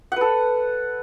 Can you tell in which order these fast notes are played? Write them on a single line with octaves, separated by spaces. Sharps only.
F#5 B4 A4